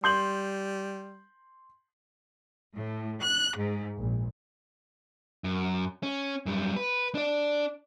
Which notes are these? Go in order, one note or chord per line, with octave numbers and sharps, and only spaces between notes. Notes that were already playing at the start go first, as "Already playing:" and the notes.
G3 C6 G6 F#7
A2
F#6
G#2
A#1
F#2
C#4
F#2 G3
B4
D4 D5